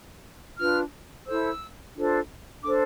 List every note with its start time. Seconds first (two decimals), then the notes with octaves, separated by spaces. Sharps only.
0.58 D4 F4 B4 F6
1.26 E4 A4 C5 E6
1.95 D4 F4 A4 C5
2.63 D4 A4 C5 D6